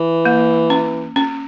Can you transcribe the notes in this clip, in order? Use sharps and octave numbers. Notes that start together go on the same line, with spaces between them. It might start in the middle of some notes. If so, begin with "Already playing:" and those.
Already playing: E3
A#3
C#4
C#4